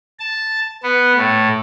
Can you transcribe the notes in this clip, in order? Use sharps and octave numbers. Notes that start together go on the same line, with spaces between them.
A5
B3
A2